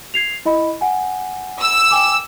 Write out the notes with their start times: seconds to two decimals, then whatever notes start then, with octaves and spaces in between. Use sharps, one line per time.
0.14 G#6 C7 F7
0.45 E4 D#5 B5
0.81 F#5 G#5
1.61 E6
1.91 G5 G#5 D6